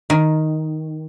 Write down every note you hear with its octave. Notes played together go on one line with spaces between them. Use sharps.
D#3